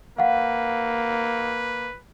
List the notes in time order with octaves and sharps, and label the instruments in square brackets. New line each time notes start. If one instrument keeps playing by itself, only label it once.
[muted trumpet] A#3 [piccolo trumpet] B4 [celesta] F5 F#5